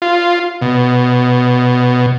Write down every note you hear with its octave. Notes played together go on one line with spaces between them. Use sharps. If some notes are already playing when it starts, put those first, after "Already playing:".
F4
B2